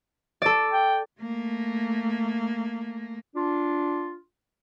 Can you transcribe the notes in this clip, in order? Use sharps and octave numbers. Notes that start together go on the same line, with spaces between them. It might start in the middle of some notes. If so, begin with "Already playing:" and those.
A4 D5
G5
A3 A#3
D4 F4